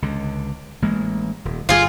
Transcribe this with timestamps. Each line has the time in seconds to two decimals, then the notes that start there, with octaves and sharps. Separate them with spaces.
0.02 C#2 D3
0.82 A1 G#3 A#3
1.45 D#1
1.69 G1 G3 F4 G#4